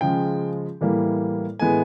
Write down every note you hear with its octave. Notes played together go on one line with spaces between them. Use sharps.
C#3 F3 G#3 G5
A2 E3 G3 A#3
A2 E3 G#3 B3 G#5